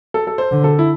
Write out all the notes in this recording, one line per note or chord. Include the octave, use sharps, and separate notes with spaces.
A4
A4
C5
D3
A4
E4